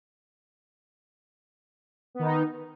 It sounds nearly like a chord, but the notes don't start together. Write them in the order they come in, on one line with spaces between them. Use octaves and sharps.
B3 D#3 D#4